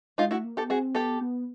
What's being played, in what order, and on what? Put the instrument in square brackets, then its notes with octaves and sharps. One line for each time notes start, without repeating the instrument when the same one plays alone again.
[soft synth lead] G#3 [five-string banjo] D#4 F4
[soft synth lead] A3 [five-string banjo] E4 F#4
[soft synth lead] A#3
[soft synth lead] B3 [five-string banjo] G4 A4
[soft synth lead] C4 [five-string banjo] F#4 G#4
[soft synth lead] B3 [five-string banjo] G4 A4
[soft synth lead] B3